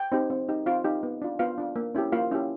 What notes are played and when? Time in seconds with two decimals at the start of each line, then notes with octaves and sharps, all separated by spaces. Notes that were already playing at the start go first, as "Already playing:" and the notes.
Already playing: G5
0.12 C4 D#4 G4
0.30 C4
0.49 D#4 G4
0.66 C4 F4 F5
0.84 D#4 G4
1.03 B3
1.22 D4 F4
1.39 B3 F4 F5
1.58 D4 F4
1.76 A#3
1.95 C#4 E4 G4
2.12 A#3 F4 F5
2.31 C#4 E4 G4